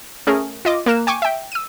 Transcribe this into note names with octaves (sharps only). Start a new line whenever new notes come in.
A3 C#4 G#4 A#4
F4 D#5 D6
A#3 A#4 F#6 E7
G5 G#5 C#6 D6
E5 G5
E6 D#7